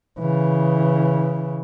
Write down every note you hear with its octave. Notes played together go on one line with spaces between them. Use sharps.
C#3 E3